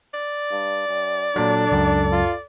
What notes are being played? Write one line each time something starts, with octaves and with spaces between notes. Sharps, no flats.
D5
G2
F#2
A#2 F#3 D4 A4
C#2 F#2
F4